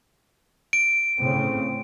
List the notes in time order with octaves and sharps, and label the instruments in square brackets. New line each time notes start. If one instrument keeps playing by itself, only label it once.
[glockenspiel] D7
[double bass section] A2 C#3 C4